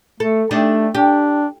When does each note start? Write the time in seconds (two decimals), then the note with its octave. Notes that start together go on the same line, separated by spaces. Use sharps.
0.20 A3 A4
0.51 A3 D4 D#4 G4
0.94 D4 G4